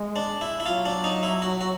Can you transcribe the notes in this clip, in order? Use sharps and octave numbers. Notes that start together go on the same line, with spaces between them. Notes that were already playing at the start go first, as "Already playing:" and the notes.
Already playing: G#3
D4
E4
E4
F#3 F4
D4
D#4
E4
F#4
F#4